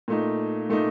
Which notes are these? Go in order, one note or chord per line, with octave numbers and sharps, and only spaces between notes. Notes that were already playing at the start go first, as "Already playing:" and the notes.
A#2 A3 D#4
A#2 A3 D#4